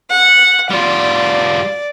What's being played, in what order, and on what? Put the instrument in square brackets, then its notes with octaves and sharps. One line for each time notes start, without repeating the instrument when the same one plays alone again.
[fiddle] F#5
[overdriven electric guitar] G3 F4 [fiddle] D5